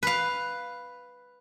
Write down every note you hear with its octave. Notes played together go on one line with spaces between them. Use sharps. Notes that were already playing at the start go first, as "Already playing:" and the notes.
B4 F5